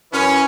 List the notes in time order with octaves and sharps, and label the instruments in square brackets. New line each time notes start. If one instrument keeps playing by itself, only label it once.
[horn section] F#2 E3 C#4